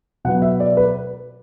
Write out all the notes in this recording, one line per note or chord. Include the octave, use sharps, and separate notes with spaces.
B2 F#3 B3 F#5
E5
D5
B4